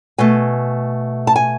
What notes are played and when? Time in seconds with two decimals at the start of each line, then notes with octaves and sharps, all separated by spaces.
0.18 B2 A3 G#5
1.27 A5
1.36 G#5